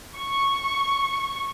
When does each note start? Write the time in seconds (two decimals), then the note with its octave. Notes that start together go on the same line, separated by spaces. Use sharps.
0.17 C#6